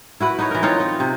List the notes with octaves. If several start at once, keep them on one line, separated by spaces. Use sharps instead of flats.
E4 F#4 B4
D#4 B4 C#5
E3 A#4
C4 D#4 F4 C#5
D#4
C3